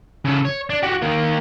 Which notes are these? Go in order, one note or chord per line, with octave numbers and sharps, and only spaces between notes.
C#3 A4
C#5
D4
F#4 G4
D#3 A#3